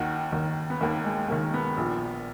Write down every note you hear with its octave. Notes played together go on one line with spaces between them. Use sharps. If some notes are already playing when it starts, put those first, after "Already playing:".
Already playing: D#2 D#3 F#4
D#2 D#3
B3
D#2 D#3 A#3
G#3
D#2 D#3 A#3
B3
A#1 A#2